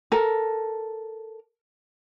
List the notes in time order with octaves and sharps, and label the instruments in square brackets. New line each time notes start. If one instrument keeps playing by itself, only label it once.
[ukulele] A4 A#4